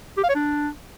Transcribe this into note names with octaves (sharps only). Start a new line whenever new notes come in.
G4
F5
C#5
D4